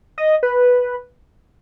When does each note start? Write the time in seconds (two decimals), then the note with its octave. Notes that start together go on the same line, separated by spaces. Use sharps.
0.18 D#5
0.43 B4